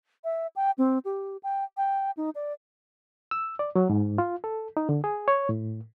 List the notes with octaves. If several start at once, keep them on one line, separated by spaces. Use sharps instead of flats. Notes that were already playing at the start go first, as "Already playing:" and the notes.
E5
G5
C4
G4
G5
G5
D#4
D5
E6
D5
F#3
G#2
F4
A4
D#4
D3
G#4
C#5
A2